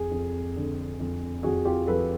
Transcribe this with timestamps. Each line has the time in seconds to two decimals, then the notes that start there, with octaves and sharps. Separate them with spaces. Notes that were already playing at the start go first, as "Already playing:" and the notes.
Already playing: F2 G#4
0.11 F2
0.56 D3
1.00 F2
1.43 F2 F#4 G#4
1.65 F4 G4
1.87 F3 A4 B4